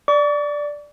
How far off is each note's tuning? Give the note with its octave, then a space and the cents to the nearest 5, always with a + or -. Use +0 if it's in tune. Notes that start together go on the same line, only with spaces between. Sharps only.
D5 +0 C#6 +45